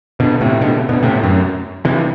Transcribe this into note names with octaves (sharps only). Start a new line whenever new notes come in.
B2 D3
A2 C3
B2 D3
B2 D3
A2 C3
F#2
C3 E3